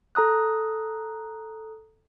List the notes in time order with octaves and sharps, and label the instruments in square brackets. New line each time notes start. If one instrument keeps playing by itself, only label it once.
[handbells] A4 A#5 D#6 F#6